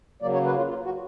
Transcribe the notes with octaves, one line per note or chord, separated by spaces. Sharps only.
C#3 F#3 A#3 D5
C#5
B4
F4
F4
F#4